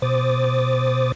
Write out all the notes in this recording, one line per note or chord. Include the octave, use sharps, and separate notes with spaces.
B2 C5 D6 D#6 A6